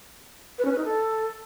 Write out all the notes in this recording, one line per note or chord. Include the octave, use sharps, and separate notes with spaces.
B4
C#4
B4
D#4
A4